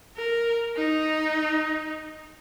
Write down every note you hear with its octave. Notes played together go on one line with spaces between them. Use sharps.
A#4
D#4